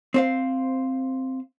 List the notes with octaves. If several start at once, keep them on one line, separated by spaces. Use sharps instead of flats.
C4 C5 F5